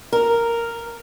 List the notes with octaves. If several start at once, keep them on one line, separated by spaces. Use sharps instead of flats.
A#4